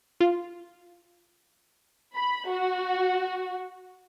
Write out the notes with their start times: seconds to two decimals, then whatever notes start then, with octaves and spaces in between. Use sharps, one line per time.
0.21 F4
2.15 B5
2.50 F#4